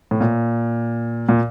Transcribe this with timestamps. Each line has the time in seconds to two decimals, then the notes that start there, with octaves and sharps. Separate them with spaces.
0.11 A2
0.21 A#2
1.29 A#2